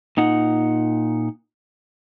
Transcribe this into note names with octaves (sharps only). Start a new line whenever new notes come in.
A#2 D#4 F#5